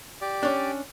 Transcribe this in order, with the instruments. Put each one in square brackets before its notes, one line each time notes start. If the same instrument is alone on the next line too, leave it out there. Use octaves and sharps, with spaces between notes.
[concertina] G4 D5
[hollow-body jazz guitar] C#4 D4